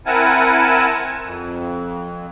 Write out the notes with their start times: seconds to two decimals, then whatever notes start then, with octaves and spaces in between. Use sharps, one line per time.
0.06 C4 E4 A#4 F#5 G#5 A5
1.24 F2